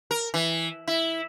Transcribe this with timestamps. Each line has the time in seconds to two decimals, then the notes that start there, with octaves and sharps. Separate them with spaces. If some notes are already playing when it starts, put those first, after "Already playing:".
0.11 A#4
0.34 E3
0.87 E4